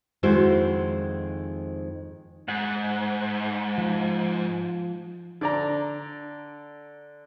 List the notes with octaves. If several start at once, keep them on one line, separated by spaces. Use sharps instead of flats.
F2 D#3 G#3 E4 F#4 C5
G#2 F#5
F3
D3 D5 A#5